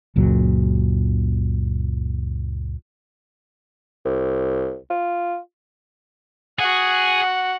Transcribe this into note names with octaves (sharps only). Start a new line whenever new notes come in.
F#1 C#2 A#2 F#3
C2
F4
F#4 G#4 F#5